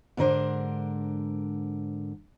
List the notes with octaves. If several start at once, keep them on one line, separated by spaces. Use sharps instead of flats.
G#2 D3 D4 A#4 C5